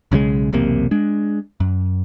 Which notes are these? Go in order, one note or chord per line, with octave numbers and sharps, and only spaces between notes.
B1 C#3 F3 G#3
E1 B1 C3 A#3
G#3 D4
F#2